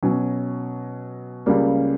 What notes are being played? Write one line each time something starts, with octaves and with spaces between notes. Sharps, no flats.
B2 F#3 C#4
C#2 C#3 G3 A#3